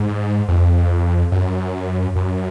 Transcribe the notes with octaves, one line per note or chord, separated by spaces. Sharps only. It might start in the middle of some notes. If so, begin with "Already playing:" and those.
Already playing: G#2
F2
F#2
F#2